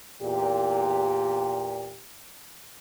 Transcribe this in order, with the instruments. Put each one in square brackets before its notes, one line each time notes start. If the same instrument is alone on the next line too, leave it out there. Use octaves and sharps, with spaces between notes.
[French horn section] E2 A#2 G4